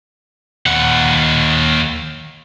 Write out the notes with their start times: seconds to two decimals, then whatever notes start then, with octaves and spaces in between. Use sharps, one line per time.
0.66 D#2 F#5